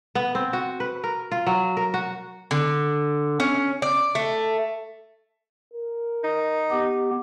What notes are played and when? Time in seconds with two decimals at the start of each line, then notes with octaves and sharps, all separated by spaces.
0.15 B3
0.35 C4
0.53 F#4
0.80 B4
1.04 A#4
1.31 F4
1.47 F#3
1.77 A#4
1.94 F#4
2.51 D3
3.40 C#4
3.82 D5
4.15 A3
5.74 A#4
6.24 D#4
6.71 B3 G4